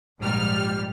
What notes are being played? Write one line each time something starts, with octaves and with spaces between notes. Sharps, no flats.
A#1 G#2 G3 F6